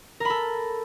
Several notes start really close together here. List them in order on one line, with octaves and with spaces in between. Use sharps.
A#4 B5 A4